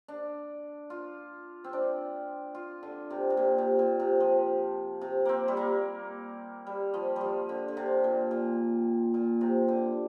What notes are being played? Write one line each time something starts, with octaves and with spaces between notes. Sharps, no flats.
D4
F4
C4
D4
F4
D3
C3
C3
A#2
C3
A#2
C3
F3
C3
A#3 C4
G3
A#3
G3
F3
F3 G3
D3
D3
C3
A#2
A#2
A#2
C3
D3